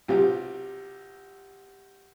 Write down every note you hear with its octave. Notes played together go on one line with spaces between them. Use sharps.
B1 C3 F4 G4